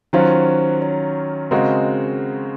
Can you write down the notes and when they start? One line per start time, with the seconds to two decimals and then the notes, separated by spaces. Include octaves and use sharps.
0.13 D#3 F#3 C#4 F4 C5
0.82 C#5
1.51 C#3 G#3 C4 F#4 A#4 D#5